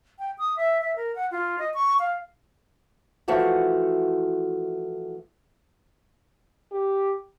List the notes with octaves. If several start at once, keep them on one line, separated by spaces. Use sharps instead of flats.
G5
D#6
E5
E5
A#4
F#5
F4
D#5
C#6
F5
E3 F3 A3 F#4
G4